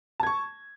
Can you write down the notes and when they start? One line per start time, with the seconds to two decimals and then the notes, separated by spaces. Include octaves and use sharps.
0.20 A5
0.23 G#6
0.27 C#6